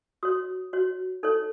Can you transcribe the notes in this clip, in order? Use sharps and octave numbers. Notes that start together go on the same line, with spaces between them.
F#4 C#5 D#6
F#4 C#5
D#4 A4 C#5